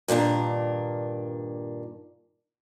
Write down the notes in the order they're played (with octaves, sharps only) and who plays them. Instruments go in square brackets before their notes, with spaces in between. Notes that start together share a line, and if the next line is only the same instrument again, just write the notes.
[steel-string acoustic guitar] G2 A#2 D#3 D4